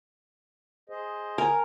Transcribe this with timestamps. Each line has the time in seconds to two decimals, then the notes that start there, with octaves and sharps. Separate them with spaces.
0.90 G#4 C5 D#5
1.38 A#4 G#5